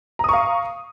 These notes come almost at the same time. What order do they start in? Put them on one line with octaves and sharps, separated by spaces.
A#5 D#6 C#6 F5